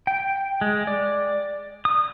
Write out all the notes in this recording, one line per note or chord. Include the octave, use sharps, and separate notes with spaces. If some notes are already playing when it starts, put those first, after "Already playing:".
G5
G#3
D5
D#6